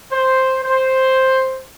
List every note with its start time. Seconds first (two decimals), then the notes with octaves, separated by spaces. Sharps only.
0.12 C5
0.63 C5